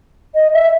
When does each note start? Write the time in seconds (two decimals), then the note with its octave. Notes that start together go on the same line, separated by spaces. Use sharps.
0.34 D#5
0.53 E5